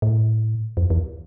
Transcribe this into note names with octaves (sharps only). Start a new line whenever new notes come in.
A2
F2
E2